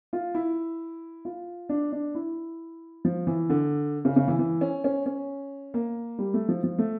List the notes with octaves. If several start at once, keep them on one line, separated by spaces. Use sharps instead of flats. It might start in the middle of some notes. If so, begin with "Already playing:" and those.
F4
E4
F4
D4
D4
E4
F3
E3
D3
C#3
C#3
E3
E3
C#4
C#4
C#4
A#3
G3
A3
F3
F3
A3